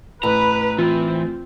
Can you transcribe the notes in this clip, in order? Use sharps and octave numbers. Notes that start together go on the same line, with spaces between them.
A1 B4 A#5
E3 C4 F4